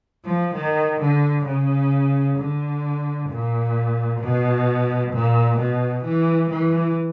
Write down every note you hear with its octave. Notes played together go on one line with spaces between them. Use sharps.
F3
D#3
D3
C#3
D3
A#2
B2
A#2
B2
E3
E3